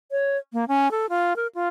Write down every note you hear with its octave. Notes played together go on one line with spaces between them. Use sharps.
C#5
A#3
C#4
A4
F4
A#4
F4